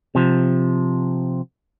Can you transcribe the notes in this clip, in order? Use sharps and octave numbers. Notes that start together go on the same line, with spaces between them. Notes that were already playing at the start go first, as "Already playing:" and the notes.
C3 F3